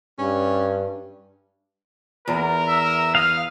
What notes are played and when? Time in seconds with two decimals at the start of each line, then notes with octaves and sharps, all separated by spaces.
0.19 G2 C#4
2.28 E2 A#4
2.68 E5
3.15 F5 D#6 F6